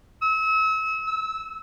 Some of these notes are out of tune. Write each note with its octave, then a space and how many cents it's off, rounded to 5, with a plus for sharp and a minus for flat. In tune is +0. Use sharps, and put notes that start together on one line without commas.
E6 -35
E6 -10